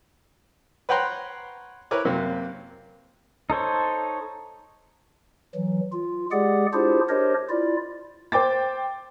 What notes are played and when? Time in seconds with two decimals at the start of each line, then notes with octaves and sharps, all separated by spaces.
0.89 B4 C#5 F#5 G5 A#5 C6
1.91 E4 A#4 B4 C#5 D6
2.05 F#2 C3 F#3 A#3
3.50 D#4 A4 C5 C#5
5.55 E3 F#3
5.92 F4
6.32 G#3 G4 G#4 D5 F#5
6.73 D4 E4 F4 G4 G#4 C5
7.09 D4 G4 A#4 C5 C#5 D#5
7.49 E4 F4 D5
8.32 C5 G5 D6 A6